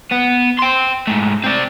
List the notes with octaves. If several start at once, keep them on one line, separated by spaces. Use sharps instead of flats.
B3
G5 C6
G#2 A3
C4 D5